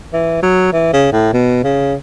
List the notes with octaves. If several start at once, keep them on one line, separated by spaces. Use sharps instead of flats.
E3
F#3
E3
C#3
A2
B2
C#3